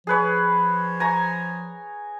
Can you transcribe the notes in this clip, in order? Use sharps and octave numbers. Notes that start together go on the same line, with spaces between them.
F3 G#4 B4 C#5
G#5 A#5 C#6